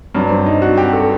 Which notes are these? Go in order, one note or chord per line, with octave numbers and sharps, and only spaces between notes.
G2 F#3 D4
C4
D#4
F#4
G4
A4